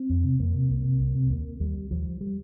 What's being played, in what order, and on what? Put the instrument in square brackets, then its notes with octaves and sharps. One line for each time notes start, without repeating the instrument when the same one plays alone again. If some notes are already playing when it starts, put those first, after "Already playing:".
Already playing: [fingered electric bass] C4
F2
C3
F2 A#3
C3
C2 A#3
C3
C2
C3
D#2 A#3
D#2 G3
D#2 F3
G3